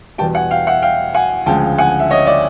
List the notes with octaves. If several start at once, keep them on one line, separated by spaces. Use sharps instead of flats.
E2 B2 G3 G5 A5
F#5 G#5
F5 G5
E5 F#5
F5 G5
F#5 G#5
D2 C#3 F3 G#3 G5 A5
F#5 G#5
E5
C#5 D#5
D5 E5